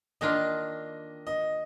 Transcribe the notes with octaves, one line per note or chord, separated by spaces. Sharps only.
D#3 A#3 D4 F4 D#5
D#5